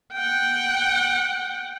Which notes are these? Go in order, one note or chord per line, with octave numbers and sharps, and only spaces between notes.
F#5 G5